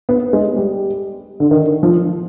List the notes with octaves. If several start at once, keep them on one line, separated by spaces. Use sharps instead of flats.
B3
G#3
G3
D3
D#3
F3